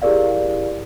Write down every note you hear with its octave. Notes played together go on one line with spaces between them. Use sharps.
E4 G4 G#4 A#4 D5 F5